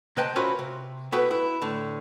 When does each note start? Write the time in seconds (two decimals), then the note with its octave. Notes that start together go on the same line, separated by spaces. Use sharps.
0.17 C3 A#3 B4 D#5 G5 A5
0.36 C4 C#4 F4 F#4 A#4 B4
0.59 C3
1.12 B3 E4 F#4 A4 B4 G5
1.31 E4
1.62 A2 D3